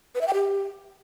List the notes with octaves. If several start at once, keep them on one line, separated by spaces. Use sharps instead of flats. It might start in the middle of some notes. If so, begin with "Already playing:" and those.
B4
E5
G5
G4